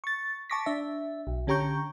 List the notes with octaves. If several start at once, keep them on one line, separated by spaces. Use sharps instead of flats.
C#6 A6
A5 C#6 D6 A#6 B6
D4 E5
B1
D3 C#4 G4 A#5 C#6 G6